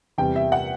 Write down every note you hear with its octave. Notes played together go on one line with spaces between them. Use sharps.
E2 C3 G3 G5
E5
F#5